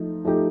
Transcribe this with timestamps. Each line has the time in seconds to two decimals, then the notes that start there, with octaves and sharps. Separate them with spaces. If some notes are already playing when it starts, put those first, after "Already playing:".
Already playing: F3 A3 D#4
0.25 F3 A3 D#4 G4